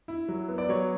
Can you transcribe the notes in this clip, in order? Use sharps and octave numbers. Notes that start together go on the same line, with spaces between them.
E4
F#3
B3
D5
F#3 C#5